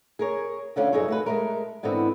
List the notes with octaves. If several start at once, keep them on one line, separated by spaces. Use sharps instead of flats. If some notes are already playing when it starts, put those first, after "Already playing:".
G#4 A#4 C#5
D2 D3 C#4 F4
G2 F#3 D#4 G#4 A4 C#5
A3 F#4 B4
G#3 A3 A#4
G#2 D3 E3 B3 C4